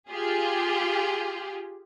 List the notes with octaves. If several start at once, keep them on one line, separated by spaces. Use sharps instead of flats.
F4 G4 G#4